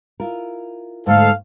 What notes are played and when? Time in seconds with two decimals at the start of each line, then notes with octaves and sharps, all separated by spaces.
0.20 E4 F4 A#4
1.07 G#2 D3 A3 A4 F5